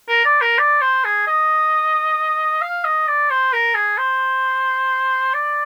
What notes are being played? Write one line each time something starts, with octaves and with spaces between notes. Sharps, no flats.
A#4
D5
A#4
D5
C5
G#4
D#5
F5
D#5
D5
C5
A#4
G#4
C5
D5